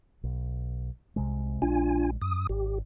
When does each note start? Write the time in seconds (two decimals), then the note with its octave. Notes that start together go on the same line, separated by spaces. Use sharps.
0.24 B1
1.16 C2 C3 G#3
1.62 A#1 G#3 D4 F4 G#5
2.22 F#2 D#6
2.49 G#1 G4